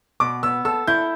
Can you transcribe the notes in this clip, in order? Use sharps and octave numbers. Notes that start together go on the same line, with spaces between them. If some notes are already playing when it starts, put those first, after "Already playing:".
B2 D6
B3 E6
A4 E6
E4 G6